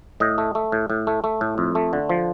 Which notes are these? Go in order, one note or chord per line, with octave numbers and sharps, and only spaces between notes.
A2 D#5
A3
A3
A2
A2
A3
A3
A2
F2
A3
D3
F3